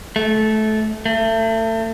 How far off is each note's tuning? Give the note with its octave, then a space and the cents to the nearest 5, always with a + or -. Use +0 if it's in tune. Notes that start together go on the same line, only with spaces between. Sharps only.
A3 -20
A3 +30